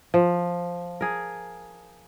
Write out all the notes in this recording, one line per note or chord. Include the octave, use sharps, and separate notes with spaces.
F3
G#4 A#4